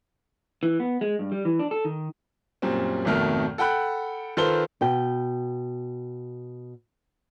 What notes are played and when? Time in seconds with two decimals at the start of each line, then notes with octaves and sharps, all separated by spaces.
0.63 E3
0.80 B3
1.01 G#3
1.19 G2
1.31 G3
1.45 E3
1.59 D4
1.71 A4
1.85 D#3
2.62 F#2 A#2 G3 C4
3.05 G#1 F2 B2 D#3 A3 F6
3.58 A4 F#5 G5 B5 F#6
4.37 D#3 F4 A4 B4 C5 G7
4.81 B2 G5